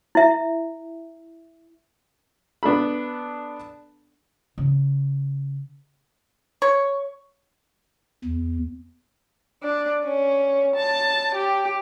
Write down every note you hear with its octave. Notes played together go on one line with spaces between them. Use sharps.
E4 E5
B3 D4 A4 B5
C#3
C#5
E2
D4
C#4
A5
G4